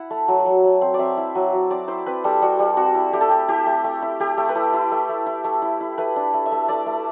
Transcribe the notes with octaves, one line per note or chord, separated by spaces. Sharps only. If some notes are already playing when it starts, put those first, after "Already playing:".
Already playing: E4 F#5
A3
F#3
F#3
F#3
C4
D5
C4 E5
E4
F#3
F#3
C4 D5
E4 C5
C4 B4
G3 A4
G3 F#4
G3
C4 F#4
E4
A3 G4
A4
E4 G4
E4 G4
A3
A3
E4
A3 G4
A3
B4
E4 A4
E4
A3
A3
E4
A3
E4
E4
A3 B4
D4
A3
E5
A3
A3 D5
A3